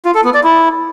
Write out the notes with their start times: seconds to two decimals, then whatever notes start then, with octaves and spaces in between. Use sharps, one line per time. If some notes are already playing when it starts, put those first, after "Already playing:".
0.05 F4
0.15 A4
0.24 B3
0.34 D5
0.44 E4